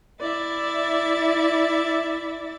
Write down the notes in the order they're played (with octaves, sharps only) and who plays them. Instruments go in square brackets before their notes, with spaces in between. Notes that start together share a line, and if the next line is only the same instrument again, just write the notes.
[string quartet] E4 D5 E5 A6